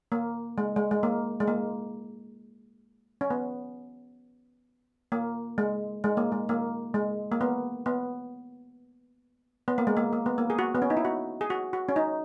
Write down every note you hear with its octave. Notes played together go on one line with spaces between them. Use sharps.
A#3
G#3
G#3
G#3
A#3
G#3
A#3
C#4
B3
A#3
G#3
G#3
A#3
G#3
A#3
G#3
A#3
B3
B3
B3
A#3
G#3
A#3
A#3
B3
A#3
G#4
F#4
B3
C#4
D#4
E4
F#4
G#4
F#4
F#4
C#4
D#4